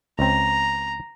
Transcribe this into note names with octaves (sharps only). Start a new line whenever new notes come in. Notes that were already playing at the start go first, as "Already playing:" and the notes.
C#2 C4 A#5